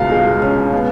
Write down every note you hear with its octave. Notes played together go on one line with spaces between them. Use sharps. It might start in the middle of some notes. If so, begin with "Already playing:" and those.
Already playing: C#2 B2 G#3 F5
G#3
C#4
B3